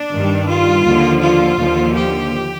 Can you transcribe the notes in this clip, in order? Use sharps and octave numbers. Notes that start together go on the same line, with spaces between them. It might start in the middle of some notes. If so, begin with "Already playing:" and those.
Already playing: D4
G2 D#3 G3
F4
D#2 D3 F3
F4
D#2 D3 F3
G4